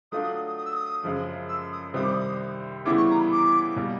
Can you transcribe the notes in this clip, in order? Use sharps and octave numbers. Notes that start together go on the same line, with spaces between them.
F#3 A3 D4 F4 D#6
D#6
D#6
D#6
D#6
E6
D#6
F#2 C#3 F3 G#3
E6
D#6
C2 C3 D#3 G3 C4 D#6
D6
D#6
C#3 E3 G3 B3 E4 D6
C#6
A#5
B5
D6
B2 G3 A#3